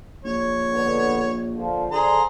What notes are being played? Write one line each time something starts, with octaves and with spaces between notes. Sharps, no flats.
A#1 C#5
D3 B3
A#2 D3 F3
D3 G#4 C5 A#5